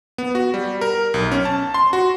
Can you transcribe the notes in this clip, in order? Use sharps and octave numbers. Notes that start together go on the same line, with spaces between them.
B3
F#4
G3
A#4
B1
C#4
A5
C6
F#4